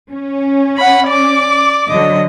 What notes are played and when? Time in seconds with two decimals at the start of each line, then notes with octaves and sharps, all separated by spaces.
0.12 C#4
0.77 F#5 B5
1.08 D5 D6
1.90 D3 F#3 D#5